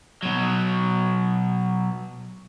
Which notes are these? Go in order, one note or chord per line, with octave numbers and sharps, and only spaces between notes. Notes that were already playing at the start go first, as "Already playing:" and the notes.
B2 F#3